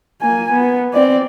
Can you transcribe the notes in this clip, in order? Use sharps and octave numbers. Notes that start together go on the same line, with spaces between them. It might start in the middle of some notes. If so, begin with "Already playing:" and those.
A#3 G#5
B3
C4 D5